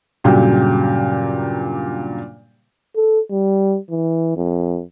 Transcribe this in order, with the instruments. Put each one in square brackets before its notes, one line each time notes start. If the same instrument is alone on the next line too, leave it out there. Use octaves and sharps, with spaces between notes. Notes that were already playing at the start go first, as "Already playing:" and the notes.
[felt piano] G2 A#2 C#3 F#3 G4 G5
[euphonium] A4
G3
E3
F2